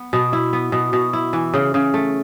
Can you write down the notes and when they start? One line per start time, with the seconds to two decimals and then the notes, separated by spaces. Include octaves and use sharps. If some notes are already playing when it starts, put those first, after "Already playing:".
Already playing: B3
0.13 B2
0.33 E4
0.53 B3
0.72 B2
0.93 B2
1.13 E4
1.33 E3
1.54 C#3
1.74 C#3
1.94 A3